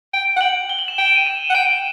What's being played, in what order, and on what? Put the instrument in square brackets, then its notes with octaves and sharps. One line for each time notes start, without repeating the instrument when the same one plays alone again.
[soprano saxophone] G5
F#5
[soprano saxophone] G5 [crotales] F#7
[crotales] G7
F#7
E7
[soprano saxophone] G5
[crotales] D#7
E7
[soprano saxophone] F#5
[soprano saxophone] G5 [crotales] D#7